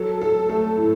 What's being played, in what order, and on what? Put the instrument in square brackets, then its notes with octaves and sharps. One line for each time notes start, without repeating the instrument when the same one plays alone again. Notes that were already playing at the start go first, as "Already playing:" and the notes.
Already playing: [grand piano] F#3 [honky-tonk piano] A4
[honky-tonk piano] A4
[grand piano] A3 [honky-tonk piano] A4
[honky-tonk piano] A2